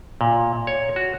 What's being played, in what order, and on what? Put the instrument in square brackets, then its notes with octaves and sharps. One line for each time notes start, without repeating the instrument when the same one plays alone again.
[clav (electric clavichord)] A#2
C#5
F#4